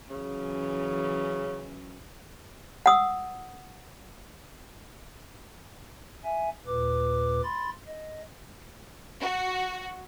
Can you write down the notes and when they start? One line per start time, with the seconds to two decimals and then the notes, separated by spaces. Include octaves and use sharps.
0.10 C#3 E3 F#3 C#4
2.86 F#5 D#6 E6
6.24 E5 G#5
6.66 D#2 A#2 B4 D6
7.44 B5 C6 A6
7.87 D#5
9.20 F#4